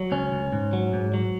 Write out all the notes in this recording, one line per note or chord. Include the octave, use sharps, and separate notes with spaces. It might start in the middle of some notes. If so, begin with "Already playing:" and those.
Already playing: F#3
C#2 C#4
C#2
G#2
F#3
G#2
F#3